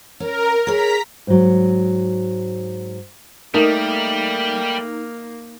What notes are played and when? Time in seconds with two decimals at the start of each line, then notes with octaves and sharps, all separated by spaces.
0.20 C#4 A#4
0.67 G#4 C#5 A#5 B6
1.27 G#2 F#3
3.54 G3 A3 A#3 D#4 A#4